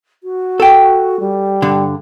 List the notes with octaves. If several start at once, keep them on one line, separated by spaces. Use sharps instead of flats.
F#4
A4 G5
G3
G2 D3